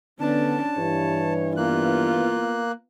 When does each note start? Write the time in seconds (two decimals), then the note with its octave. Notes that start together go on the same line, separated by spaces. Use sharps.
0.20 D3 B3 C#4 D4 A5
0.78 G2 E3 C#5
1.57 A#3 B3 F4 F#6